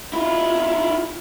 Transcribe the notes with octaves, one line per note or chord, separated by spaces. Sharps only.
E4 F4